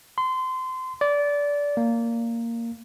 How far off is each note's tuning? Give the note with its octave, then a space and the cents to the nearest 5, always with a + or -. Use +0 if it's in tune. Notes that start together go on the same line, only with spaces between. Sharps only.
C6 -25
D5 -20
A#3 -10